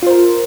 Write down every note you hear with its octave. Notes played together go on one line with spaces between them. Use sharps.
F4 A#4 C5